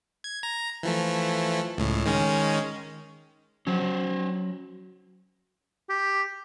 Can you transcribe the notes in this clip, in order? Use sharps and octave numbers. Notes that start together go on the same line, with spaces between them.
G#6
A#5
E3 F3 A3
C#2 A2
D#3 G#3 C#4
F#3 C#4 C5
G4